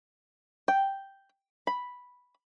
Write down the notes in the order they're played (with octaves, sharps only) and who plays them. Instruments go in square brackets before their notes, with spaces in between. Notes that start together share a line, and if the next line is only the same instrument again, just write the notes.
[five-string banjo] G5
B5